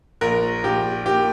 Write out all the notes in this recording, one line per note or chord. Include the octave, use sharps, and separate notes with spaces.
A#1 A#4
A#1 G4
A#3 G4